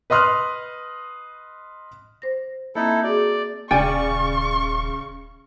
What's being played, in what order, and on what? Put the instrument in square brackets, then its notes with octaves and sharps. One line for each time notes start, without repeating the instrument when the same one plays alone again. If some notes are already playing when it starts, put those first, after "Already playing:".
[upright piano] B4 D#5 C6 D#6 F6 F#6
[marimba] C5 A#6
[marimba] A#3 C4 [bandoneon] D#4 E4 A4
[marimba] F#4 G#4 [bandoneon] D5
[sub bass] D#1 [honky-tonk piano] C#3 D5 [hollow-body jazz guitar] G5 G#5 [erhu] C#6